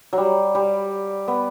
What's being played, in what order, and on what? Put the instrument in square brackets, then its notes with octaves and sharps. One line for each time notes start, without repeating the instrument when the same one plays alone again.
[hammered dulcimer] F#3
G3
G3
B3